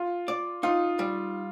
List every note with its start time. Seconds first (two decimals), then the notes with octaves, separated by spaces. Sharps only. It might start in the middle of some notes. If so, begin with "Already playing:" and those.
Already playing: F4
0.28 D5
0.63 D#4 F4
0.99 G3